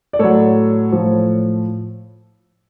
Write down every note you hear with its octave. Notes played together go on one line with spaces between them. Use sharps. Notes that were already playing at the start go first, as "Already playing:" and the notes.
D5
A2 F#3 A4 C#5
A2 F3